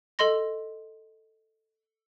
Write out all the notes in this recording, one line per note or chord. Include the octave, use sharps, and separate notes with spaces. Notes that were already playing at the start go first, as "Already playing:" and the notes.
A4 D#5 C6 A#6